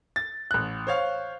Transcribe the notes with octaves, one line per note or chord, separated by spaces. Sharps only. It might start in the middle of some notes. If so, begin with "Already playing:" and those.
A6
A1 F#6
C5 C#5 F5